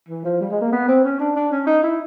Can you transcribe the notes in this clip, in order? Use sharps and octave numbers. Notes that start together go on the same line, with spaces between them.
E3
F3
G3
G#3
A#3
B3
C4
C#4
D4
D4
C#4
D#4
E4